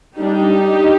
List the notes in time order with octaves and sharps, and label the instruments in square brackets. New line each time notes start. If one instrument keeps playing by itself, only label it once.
[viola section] G3 D4 D#4 G4